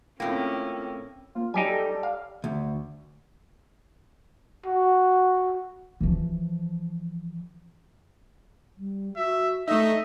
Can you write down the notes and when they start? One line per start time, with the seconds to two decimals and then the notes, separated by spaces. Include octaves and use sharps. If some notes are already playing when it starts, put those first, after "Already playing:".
0.20 A2 A#3 C4 C#4 F4 A4 G5 A#6
1.35 A#3 F4
1.54 F#3 G3 D#4 G4 G#5
1.66 A4
2.03 F5
2.44 D2
4.66 F#4
6.00 E3 F3
8.77 G3
9.16 F#4 E5
9.68 A3 D#4 A4 D#5 E5